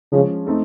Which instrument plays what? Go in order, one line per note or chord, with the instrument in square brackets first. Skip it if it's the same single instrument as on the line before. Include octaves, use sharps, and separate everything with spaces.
[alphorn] C#3 [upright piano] F3 G#3 C#4
[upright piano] A3 C4 D#4